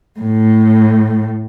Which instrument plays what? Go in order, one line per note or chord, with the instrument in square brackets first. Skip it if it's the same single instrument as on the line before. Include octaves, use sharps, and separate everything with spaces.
[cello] A2 A3